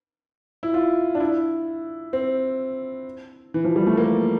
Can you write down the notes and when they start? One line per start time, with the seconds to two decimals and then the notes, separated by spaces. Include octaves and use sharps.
0.63 E4
0.74 F4
1.15 D4
1.20 E4
2.13 C4
3.54 E3
3.65 F3
3.76 G3
3.87 A3
3.97 A#3